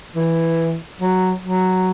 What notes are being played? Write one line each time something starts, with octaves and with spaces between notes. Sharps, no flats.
E3
F#3
F#3